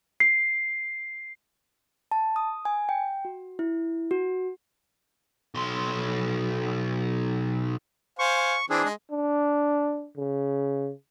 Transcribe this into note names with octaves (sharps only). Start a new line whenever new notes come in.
C7
A5
D#6
G#5
G5
F#4
E4
F#4
B1 C6
C5 F5 G#5 C#6
E3 C4 D4 G#4
G#3
D4
C#3